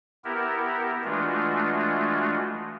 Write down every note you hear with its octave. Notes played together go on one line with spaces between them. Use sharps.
B3 E4 G4 A#4
E3 G#3 A3 D4 F4 F#4